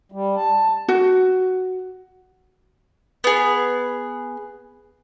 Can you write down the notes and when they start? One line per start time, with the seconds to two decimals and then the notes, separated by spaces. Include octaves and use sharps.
0.12 G3
0.36 A5
0.89 F#4
3.24 B3 G#4